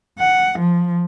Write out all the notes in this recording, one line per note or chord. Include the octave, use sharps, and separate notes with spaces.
F#5
F3